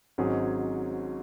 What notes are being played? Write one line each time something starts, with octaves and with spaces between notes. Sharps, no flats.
G#1 G#2 F#3 C#4 G#4